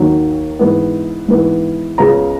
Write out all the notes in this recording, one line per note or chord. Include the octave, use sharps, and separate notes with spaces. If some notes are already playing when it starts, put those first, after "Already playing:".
Already playing: D#2 D#3 F#3
G#2 E3 B3
G#2 E3 B3
C#2 C#3 G#3 B3 A#5